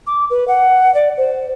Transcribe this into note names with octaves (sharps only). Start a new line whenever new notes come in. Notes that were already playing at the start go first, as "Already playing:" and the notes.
D6
B4
F#5
D5
C5